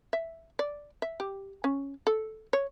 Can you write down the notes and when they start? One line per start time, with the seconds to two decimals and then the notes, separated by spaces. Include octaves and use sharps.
0.13 E5
0.59 D5
1.02 E5
1.20 G4
1.64 C#4
2.07 A4
2.53 C#5